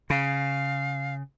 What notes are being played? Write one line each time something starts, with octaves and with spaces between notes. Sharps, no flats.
C#3 F5